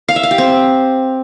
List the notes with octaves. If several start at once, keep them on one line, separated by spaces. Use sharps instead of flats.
F5
E5
F5
G4
C4